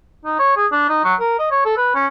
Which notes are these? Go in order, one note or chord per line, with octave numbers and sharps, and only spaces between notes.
D#4
C#5
G#4
D4
D#4
F#3
A#4
D#5
C#5
A4
B4
C#4